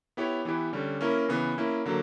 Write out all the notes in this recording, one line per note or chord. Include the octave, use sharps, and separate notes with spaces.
B3 E4 G4 C#5
E3 B3 E4 G4
D3 G3 C#4
A#3 C#4 E4 A#4
C#3 E3 B3
A#3 C#4 E4
D3 F#3 A#3